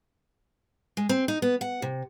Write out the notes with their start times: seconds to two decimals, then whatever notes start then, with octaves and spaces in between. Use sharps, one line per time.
0.97 G#3
1.09 C4
1.28 D#4
1.42 B3
1.61 F#5
1.82 C3